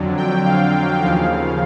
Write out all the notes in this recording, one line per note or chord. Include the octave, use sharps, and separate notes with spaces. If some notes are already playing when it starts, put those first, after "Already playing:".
Already playing: F2 D3 F#3
G5
F5
D#2 C#3 F3 F5